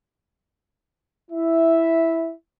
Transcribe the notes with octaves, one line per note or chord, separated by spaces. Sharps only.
E4 E5